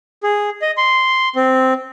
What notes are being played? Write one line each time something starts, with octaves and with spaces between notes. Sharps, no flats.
G#4
D#5
C6
C4